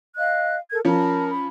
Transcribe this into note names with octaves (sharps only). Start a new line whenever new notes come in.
D#5 F5 F#6
A4 A#4 G#6
F3 C#4 A#4 A5 B5
B5